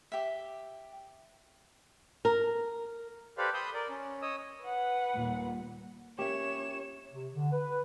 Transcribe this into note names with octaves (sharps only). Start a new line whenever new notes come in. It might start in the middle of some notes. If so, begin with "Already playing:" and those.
G4 E5
A#4
G4 A4 B4 C5 D5 F5
B5 C6 D#6 E6 G6
A#4 D5
C#4
C#5 D#5 D#6 E6
B4 F#5
D#2 A#2 G3
A#3 C#4 G4 C#5 E5 E7
C3
D3
B4